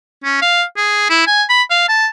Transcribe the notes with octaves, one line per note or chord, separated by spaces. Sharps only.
C#4
F5
G#4
E4
G#5
B5
F5
A5